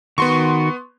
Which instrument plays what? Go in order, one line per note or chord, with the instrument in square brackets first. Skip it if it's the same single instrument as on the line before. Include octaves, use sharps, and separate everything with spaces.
[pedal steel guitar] D#3 F#4 [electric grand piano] B3 C6 C#6